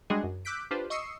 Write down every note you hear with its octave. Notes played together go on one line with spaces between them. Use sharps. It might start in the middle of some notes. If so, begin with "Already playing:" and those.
G3 G#3 D4 F#4 G#4 D#5
F#2
D6 E6 F#6 G6 B6 D7
D4 F4 G4 B4 C5
D#5 C#6 D#6 E6 C7 C#7